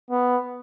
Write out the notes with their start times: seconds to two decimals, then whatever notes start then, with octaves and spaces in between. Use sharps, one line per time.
0.11 B3